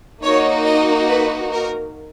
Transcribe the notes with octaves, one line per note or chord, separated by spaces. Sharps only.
A#3 D#4 F#4 C#5
D#5
B4
A#4